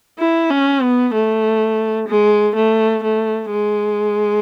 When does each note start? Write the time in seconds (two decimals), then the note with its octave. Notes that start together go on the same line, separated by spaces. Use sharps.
0.19 E4
0.51 C#4
0.82 B3
1.14 A3
2.08 G#3
2.56 A3
3.03 A3
3.51 G#3